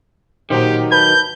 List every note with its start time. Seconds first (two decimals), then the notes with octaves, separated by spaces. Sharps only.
0.50 A#2 D#3 F#3 D#4 G4 C5
0.92 B4 A5 B5 G6